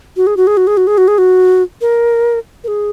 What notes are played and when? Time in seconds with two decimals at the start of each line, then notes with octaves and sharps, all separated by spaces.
0.17 F#4
0.27 G#4
0.37 F#4
0.47 G#4
0.57 F#4
0.67 G#4
0.77 F#4
0.87 G#4
0.98 F#4
1.08 G#4
1.18 F#4
1.81 A#4
2.64 A#4
2.68 G#4